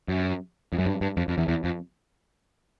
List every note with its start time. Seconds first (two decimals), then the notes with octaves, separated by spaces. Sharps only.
0.08 F#2
0.73 F2
0.78 F#2
0.86 G2
1.01 G2
1.17 F2
1.28 F2
1.38 E2
1.48 E2
1.64 F2